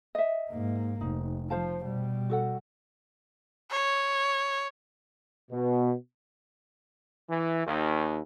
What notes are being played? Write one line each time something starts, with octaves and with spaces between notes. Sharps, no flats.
D#5 E5
G#2 A#3
F1 D#4
F3 C5 F5 A5
B2 G3
F#4 A4 F#5
C#5
B2
E3
D#2